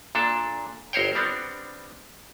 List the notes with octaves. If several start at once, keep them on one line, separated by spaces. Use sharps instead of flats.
A#2 D4 A4
G1 A#4 C5 C#5 G5
G3 B3 C4 D4